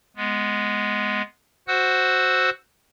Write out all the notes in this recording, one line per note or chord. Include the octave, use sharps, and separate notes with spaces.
G#3 B3
F#4 C5 F#5 E6 F#6